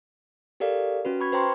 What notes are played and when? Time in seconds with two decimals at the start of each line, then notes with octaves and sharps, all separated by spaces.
0.60 G4 A4 A#4 D5 F5
1.05 C#4 F#4 B4
1.21 B5 C#6 G#6
1.32 B4 C5 G5 A#5 C6 C#6